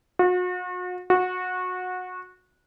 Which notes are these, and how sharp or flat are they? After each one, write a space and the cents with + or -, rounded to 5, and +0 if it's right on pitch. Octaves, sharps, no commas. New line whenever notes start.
F#4 -40
F#4 -20